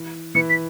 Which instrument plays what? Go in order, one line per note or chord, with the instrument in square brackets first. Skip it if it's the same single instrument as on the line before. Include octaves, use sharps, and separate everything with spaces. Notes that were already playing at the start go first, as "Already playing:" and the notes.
Already playing: [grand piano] E3
[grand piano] E3 [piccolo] C#7
[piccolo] B6